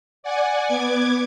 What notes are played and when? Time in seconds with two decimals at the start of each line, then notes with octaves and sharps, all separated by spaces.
0.23 D5 F#5 G#5
0.65 B3 D6 G#6